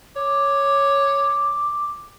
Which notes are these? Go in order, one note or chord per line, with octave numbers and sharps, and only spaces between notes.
C#5 D6